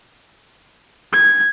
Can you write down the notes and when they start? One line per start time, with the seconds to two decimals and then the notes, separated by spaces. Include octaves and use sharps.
1.13 G#6